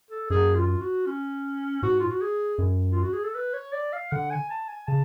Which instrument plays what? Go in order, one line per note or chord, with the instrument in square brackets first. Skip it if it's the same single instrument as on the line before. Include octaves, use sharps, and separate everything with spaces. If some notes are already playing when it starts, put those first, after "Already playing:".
[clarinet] A4
[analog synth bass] F#2 [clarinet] G#4
[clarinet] F4
F#4
C#4
[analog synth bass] G#2 [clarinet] F#4
[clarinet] F4
F#4
G#4
[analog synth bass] F#2
[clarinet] F4
F#4
G#4
A4
B4
C#5
D5
F5
[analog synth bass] D3 [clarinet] F#5
[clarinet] G#5
A5
G#5
[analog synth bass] C#3 [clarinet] A5